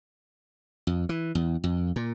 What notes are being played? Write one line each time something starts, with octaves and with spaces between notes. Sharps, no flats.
F2
E3
E2
F2
A#2